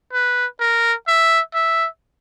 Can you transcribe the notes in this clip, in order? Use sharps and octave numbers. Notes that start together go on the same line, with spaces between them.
B4
A#4
E5
E5